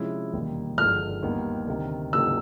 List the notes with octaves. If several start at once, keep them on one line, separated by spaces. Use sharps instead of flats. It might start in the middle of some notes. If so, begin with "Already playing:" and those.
Already playing: C3 F3 G#3 C#4 E4
E1 D#2 D#3 G3
G1 G2 D3 F3 G#3 F6
D#2 D#3 G3 B3
D2 C3 D#3
D#2 C#3 F#3 A#3 E6